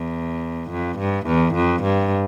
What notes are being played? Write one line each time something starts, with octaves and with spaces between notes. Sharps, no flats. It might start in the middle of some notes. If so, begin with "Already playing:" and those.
Already playing: E2
F2
G2
E2
F2
G2